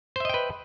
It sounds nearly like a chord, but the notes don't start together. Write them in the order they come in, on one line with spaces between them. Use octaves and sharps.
C5 E5 D#5 G5 B4